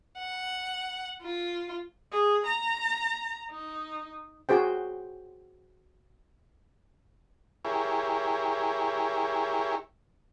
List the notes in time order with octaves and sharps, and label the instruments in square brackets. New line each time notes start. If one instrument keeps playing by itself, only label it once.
[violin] F#5
F4
[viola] G#4
A#5
D#4
[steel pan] F#4 G#4 C5 G5
[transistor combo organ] E4 G4 G#4 A#4 C#5